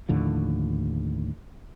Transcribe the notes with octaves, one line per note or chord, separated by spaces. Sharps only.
D#2 A2 D3 F3